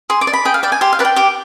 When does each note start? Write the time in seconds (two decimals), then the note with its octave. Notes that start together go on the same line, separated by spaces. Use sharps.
0.10 G#4 C6
0.21 D6
0.27 D5
0.33 B5
0.45 G#4 G5
0.54 F5
0.63 D5 G5
0.72 G#5
0.81 G4 C6
0.93 F5
0.99 B4 D5
1.05 G5
1.16 G4 D6